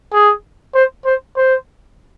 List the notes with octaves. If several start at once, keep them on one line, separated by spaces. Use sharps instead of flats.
G#4
C5
C5
C5